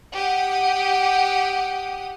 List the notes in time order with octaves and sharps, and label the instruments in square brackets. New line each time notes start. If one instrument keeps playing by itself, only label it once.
[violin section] G4 F#5 D#6